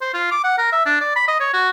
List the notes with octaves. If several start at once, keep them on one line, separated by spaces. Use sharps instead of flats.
C5
F4
D6
F#5
A#4
E5
D4
D5
B5
D#5
C#5
F#4